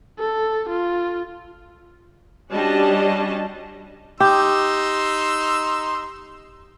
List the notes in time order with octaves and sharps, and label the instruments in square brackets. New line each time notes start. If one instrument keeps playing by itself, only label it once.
[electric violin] A4
F4
[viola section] G3 C#4 D4 F#4 D#5 A5
[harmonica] D#4 C6 E6 [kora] G4